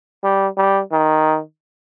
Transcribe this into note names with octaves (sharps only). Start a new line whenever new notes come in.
G3
G3
D#3